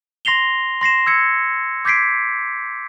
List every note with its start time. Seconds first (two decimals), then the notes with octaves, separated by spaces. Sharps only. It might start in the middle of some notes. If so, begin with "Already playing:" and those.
0.25 C6 A#6 C7 F7 G7
0.81 C6 A#6 C7 E7
1.06 E6 G#6 C#7
1.85 D6 G6 G#6 B6 C7 D7